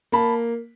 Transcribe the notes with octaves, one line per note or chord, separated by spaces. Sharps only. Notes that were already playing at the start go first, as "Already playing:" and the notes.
A#3 A5 B5